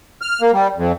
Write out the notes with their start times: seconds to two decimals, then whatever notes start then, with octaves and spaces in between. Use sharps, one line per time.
0.22 F6
0.41 A#3
0.53 G3
0.77 F2